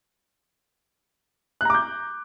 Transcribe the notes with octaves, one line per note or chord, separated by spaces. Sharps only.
A#5 D6 F#6 G6